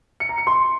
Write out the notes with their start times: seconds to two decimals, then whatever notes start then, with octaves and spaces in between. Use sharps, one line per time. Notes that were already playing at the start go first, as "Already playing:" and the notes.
0.20 C#7
0.29 A#5
0.38 C#7
0.47 C6